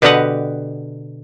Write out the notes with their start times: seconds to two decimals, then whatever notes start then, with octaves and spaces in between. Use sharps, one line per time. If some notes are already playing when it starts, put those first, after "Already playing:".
0.02 B2 D3 G4 B4 D#5 F#5